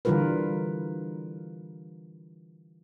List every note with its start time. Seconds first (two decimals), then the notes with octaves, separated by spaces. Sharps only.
0.05 D3 E3 G3 F4 A#4 B4